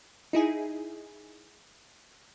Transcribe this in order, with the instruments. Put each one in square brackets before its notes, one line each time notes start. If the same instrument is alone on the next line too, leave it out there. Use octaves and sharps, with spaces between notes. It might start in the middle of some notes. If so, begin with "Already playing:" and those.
[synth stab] D#4 E4 G#4